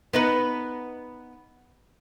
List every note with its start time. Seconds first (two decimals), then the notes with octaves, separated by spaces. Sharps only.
0.13 B3 D#4 B4